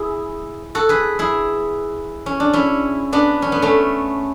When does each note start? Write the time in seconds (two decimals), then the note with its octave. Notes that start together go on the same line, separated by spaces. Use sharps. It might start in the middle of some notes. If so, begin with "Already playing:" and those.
Already playing: E4 G#4
0.75 F#4 A4
0.89 G#4 B4
1.19 E4 G#4
2.26 C#4
2.40 D4
2.53 C#4 E4
3.13 B3 D4
3.42 C#4
3.52 B3
3.62 A3 C#4